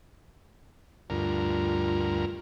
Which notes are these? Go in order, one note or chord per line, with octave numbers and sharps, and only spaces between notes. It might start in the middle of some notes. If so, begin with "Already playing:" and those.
D2 G2 F4 A#4